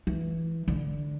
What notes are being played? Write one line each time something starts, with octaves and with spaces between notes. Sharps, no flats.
E3
D3